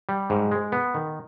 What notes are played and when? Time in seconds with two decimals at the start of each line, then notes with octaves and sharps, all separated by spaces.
0.09 G3
0.30 G#2
0.52 G#3
0.72 B3
0.94 D#3